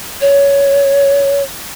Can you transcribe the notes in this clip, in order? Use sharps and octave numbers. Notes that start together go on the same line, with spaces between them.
C#5